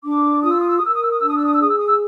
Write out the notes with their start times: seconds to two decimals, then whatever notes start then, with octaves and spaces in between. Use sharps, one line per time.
0.04 D4 D6
0.42 F4 D#6
0.51 E6
0.60 D#6
0.69 E6
0.77 D#6
0.82 A#4 E6
0.94 D#6
1.02 E6
1.11 D#6
1.19 D4 E6
1.28 D#6
1.36 E6
1.44 D#6
1.53 E6
1.60 G#4 D#6
1.70 E6
1.78 D#6
1.87 E6